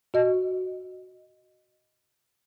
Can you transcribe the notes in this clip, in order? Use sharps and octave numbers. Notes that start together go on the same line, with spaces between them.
F#4 D#5